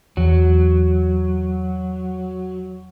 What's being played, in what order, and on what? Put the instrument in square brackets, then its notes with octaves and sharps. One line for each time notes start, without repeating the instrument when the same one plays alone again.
[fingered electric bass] E2 [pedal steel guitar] F#3